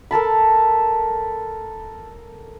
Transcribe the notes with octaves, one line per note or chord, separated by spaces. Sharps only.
A4 A#4 A5 B5